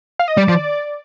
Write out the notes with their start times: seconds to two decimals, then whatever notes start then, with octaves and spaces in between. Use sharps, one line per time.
0.19 F5
0.28 D#5
0.37 G3 D5
0.48 F3